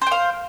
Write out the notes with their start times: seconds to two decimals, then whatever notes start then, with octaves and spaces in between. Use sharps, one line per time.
0.02 C5
0.07 G5
0.11 F5